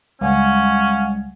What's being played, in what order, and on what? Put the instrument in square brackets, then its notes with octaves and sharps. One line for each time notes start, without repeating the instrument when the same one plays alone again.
[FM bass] C#2 [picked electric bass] G3 G#3 [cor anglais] C#4 [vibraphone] F5 F#5 G#5